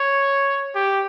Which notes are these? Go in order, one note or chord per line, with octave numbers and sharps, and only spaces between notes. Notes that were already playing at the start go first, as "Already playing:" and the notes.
Already playing: C#5
G4